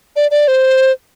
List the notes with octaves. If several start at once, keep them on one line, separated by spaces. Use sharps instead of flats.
D5
D5
C5